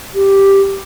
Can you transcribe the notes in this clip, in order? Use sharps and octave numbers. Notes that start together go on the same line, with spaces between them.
G4